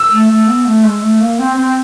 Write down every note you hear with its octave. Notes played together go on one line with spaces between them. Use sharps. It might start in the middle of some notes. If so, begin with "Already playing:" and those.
Already playing: E6
A3
A3
B3
A3
G#3
A3
A#3
C4
C4